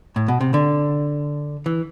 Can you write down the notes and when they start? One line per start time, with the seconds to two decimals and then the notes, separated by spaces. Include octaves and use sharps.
0.16 A2
0.28 B2
0.41 C3
0.54 D3
1.66 E3